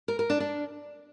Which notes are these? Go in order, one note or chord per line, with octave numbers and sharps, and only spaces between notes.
A#4
A#4
D4
D4